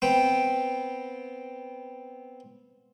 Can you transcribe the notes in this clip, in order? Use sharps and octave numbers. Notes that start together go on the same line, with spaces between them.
B3 C4 G5